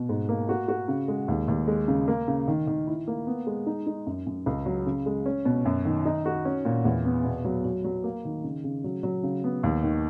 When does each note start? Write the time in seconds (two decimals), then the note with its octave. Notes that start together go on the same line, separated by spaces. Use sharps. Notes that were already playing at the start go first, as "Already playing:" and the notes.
Already playing: B2
0.09 G#2
0.29 A#3
0.49 F#4
0.68 F#4
0.88 C#3
1.08 G#3
1.28 D#2
1.48 D#2
1.68 G#3
1.88 C#3
2.08 A#3
2.28 C#3
2.48 D#3
2.67 D#3
2.87 E4
3.08 A#3
3.27 B3
3.47 G#3
3.67 D#4
3.87 D#4
4.06 F#2
4.27 F#2
4.46 C#2
4.66 F#3
4.86 C#3
5.06 G#3
5.26 C#4
5.45 B2
5.65 F#2
5.85 D#3
6.05 D#4
6.26 F#4
6.45 C#4
6.65 A#2
6.85 E2
7.05 B3
7.25 B2
7.45 F#3
7.65 F#3
7.85 F#3
8.04 A#3
8.25 D#3
8.44 C#3
8.64 C#3
8.84 F#3
9.03 F#3
9.23 C#3
9.44 B3
9.63 D#2
9.83 D#3